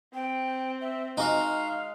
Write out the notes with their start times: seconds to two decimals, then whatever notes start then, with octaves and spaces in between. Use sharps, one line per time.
0.14 C4 G5
0.81 E5
1.17 G#3 D#4 F#4 F5